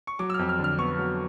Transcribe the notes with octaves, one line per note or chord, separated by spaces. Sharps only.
C#6
F#3 D6
E6
F2 F6
F6
D3
F6
B3 C#6
F#3